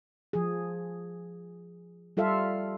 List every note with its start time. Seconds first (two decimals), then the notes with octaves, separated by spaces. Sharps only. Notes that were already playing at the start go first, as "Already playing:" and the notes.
0.33 F3 G#4
2.17 G3 F4 A4 E5 F5